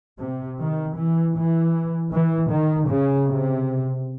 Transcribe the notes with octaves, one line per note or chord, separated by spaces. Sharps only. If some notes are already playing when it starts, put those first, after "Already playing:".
C3
D#3
E3
E3
E3
D#3
C#3
C3